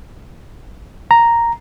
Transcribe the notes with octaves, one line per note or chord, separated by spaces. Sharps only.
A#5